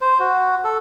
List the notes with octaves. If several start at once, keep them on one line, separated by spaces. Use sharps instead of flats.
C5
F#4
A4